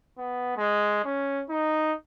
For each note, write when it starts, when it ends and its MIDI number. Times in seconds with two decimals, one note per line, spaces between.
0.18 0.56 59
0.57 1.02 56
1.04 1.43 61
1.49 1.93 63